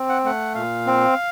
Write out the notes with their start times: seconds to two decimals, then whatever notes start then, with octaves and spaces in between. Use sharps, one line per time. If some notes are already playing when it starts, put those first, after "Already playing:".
Already playing: C4
0.09 F#5
0.25 A3 F#5
0.55 A#2 F5
0.87 C4